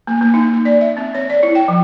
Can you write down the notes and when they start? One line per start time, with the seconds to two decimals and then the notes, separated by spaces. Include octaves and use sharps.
0.07 A#3
0.21 A#3
0.34 D#4
0.53 A#3
0.65 D5
0.81 E5
0.97 C4
1.15 C#5
1.30 D5
1.43 E4
1.55 G5
1.68 F3